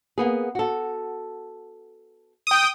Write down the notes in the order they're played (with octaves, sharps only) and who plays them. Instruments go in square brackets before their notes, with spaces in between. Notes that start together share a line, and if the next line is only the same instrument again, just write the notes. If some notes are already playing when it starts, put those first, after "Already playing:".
[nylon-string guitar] A#3 B3 G#4
F#4 A4
[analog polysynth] G5 D#6